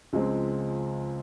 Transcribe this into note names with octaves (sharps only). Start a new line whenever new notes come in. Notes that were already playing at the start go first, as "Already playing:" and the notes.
C#2 C#3 F3 G#3 C4